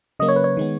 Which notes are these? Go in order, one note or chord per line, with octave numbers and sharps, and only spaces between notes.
C#3 F#3 A#3 D#5
C#5
B4
C#5
D#3 G#3 B3